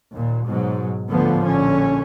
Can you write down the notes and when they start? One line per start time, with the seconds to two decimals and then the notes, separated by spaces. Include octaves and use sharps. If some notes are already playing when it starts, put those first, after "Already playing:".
0.12 D#2 A#2
0.45 G#2 B2 F#3
1.11 D2 A2 D3 F3 B3
1.46 A#1 D3 C#4